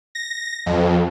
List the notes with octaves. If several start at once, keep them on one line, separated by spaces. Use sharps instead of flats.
A#6
F2